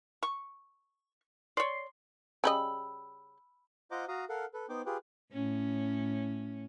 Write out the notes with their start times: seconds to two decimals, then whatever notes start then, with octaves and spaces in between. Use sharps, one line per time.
0.23 C#6
1.57 C#5 D5 C6
2.44 C#3 G3 D#5 B5 E6
3.91 F4 C5 D#5 F#5 A#5 D6
4.08 F#4 F5 A#5 D#6
4.29 A4 A#4 F5 F#5
4.54 A4 B4
4.69 B3 D#4 C5 G5 D6
4.86 F4 G4 G#4 B4 G5
5.32 A2 C#4